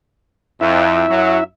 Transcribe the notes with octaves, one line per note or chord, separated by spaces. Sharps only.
F2 E4 E5
F#2 F#3